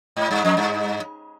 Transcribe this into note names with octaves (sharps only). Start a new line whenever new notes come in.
G#2
G2
F2
G2